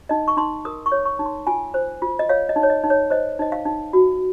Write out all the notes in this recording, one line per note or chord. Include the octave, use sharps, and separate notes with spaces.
D#4 D#5
C#6
D#4 C6
A#4 D#6
C#6
C#5
C#6
D#4
C6
F4 G#5
C5
F4
D#5
C#5 F5
D#5
D#4
C#5
D#5
D#4
C#5
C5 D#5
D#4 D#5
F5
D#4
F#4